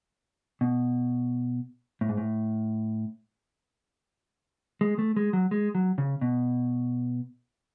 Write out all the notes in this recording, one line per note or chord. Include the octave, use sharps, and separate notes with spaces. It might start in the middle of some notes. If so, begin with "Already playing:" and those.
B2
A2
G#2
A2
G#3
A3
G#3
F#3
G#3
F#3
C#3
B2